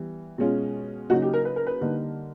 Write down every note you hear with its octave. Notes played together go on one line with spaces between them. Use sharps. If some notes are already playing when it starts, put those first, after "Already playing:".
Already playing: E3 G3 B3
B2 G#3 C#4 F4
C#3 F#3 A#3 D#4 F#4
G4
A#4
B4
A#4
B4
D3 G3 A#3 D#4